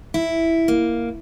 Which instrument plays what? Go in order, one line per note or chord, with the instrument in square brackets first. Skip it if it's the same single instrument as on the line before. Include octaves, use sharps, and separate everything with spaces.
[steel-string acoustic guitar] E4
A#3